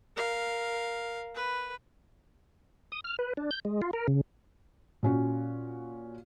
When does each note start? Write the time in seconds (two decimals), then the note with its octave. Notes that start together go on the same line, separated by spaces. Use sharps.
0.16 A#4 F5
1.35 B4
2.92 D#6
3.04 F6
3.19 B4
3.37 D4
3.51 G6
3.65 G#3
3.82 F4
3.93 A#4
4.08 C#3
5.03 A#2 C#4 F#4